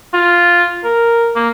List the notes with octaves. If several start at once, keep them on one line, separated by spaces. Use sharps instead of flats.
F4
A#4
A#3